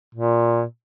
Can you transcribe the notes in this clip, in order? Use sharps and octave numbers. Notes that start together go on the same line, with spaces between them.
A#2